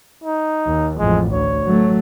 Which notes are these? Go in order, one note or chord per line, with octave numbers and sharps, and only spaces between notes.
D#4
D#2
A1 F2 G#3
D2 C#5
F#3 A3